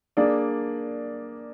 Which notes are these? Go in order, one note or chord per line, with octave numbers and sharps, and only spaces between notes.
A#3 D4 G#4 D5